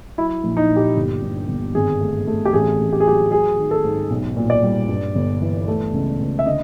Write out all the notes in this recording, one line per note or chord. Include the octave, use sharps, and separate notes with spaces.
F#3 E4
A#1
D#4
A#2
G4
G1
G2
G1
G#1 G#4
A3
A3
G4
A1 G#4
A1
G4
G#4
F#3 G4
F#3 G#4
D#3
A4
G#2
B1
A#2
D5
G3
G2
G1
E3
A3
C#2
C#2
E5
D3 D#5